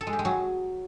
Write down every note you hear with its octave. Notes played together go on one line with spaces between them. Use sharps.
A4
G#3
G4
G#3
F#3